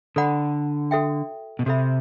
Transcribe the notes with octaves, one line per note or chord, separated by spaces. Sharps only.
D3 A4 D5 F#5 B5
F#4 A4 E5 G5
B2
C3 F#4 A4 E5 B5